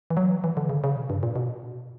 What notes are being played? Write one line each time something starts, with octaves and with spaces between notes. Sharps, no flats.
E3
F#3
E3
D3
C#3
C#3
B2
G2
A#2
B2